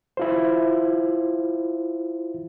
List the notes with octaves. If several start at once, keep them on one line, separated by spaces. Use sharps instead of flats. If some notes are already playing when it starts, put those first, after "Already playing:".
E4 F4 C5